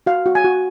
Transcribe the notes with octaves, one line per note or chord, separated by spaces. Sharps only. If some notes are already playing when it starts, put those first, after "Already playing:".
F#4 F5
F#4
G#5
F#4